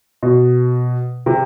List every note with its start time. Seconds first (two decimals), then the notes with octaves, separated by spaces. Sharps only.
0.23 B2
1.26 C3